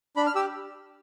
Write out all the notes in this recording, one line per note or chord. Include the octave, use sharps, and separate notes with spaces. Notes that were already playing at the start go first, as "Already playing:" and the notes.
D4 B5
F6
G4 E6